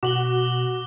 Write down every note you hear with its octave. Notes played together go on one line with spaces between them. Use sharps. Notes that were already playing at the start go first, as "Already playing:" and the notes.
B2 F#4 D6 F#7 G7